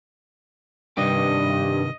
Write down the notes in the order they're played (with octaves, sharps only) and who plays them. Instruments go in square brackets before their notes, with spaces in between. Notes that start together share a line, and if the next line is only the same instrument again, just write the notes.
[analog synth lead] G2 [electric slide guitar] C3 D#3 G4 [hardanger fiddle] D#5